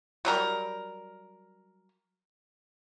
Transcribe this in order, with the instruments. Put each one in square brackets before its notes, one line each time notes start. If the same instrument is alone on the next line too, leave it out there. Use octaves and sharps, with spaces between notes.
[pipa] F#3 G3 A#4